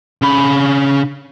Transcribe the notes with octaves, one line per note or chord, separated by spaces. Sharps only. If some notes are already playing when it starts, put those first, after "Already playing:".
C#3 B5